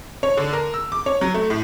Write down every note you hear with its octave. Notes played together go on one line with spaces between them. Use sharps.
C#5
D3
A#4
E6
D6
C#5
F#3
A3
A2